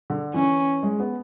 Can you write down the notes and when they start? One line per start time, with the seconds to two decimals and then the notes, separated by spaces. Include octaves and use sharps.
0.10 D3
0.34 E3 C#4
0.83 G#3
1.00 B3